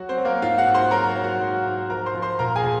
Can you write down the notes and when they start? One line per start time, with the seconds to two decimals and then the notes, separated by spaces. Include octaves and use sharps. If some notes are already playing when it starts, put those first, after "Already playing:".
Already playing: F#3 F#4 F#5
0.09 C4 C5
0.17 F#3
0.25 A#3 A#4
0.42 G#2 F4 F5
0.58 F#4 F#5
0.67 G#2
0.74 C5 C6
0.91 F#3 A#4 A#5
1.16 F#3
1.23 F#4 F#5
1.40 G#2
1.65 G#2
1.89 F3 A#4 A#5
2.06 C5 C6
2.14 F3
2.22 C5 C6
2.39 A#2 A#4 A#5
2.56 G#4 G#5
2.64 A#2